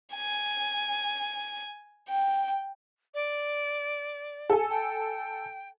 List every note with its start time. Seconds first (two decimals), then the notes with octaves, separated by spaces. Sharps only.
0.14 G#5
2.09 G5
3.14 D5
4.50 A4 G#5
4.70 G5